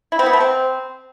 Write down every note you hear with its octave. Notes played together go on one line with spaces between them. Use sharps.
E4
C4
B3
A3
C4